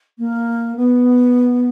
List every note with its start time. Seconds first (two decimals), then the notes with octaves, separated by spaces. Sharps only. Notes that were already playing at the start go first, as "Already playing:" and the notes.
0.18 A#3
0.76 B3